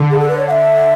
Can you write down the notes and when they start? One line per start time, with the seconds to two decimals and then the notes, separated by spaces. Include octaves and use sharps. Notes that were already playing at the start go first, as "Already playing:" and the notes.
Already playing: D3
0.10 G#4
0.19 A4
0.29 B4
0.38 C#5
0.47 F#5
0.50 E5